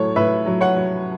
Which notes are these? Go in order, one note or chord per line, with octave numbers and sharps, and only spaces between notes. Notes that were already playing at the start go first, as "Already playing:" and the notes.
Already playing: A2 F#3 A4 C#5
A2 B4 E5
F#3
C#5 F#5
F#3